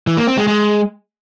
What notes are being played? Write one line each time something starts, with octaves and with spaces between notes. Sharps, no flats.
E3
A#3
C4
G#3
G#3